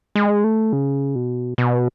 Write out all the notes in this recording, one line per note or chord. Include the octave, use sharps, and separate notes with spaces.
G#3
A3
C#3
B2
B2